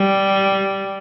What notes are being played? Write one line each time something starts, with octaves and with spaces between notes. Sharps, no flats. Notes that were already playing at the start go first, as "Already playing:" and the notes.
Already playing: G3